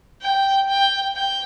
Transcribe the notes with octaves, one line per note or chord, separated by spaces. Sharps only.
G5
G5
G5